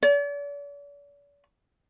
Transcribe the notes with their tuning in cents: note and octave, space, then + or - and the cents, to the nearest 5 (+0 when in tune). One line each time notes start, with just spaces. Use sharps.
D5 -45